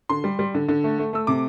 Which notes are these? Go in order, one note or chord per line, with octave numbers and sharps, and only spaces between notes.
D3 C6
G3
G3
D3
D3
A3
A3
A3 E6
C3 D6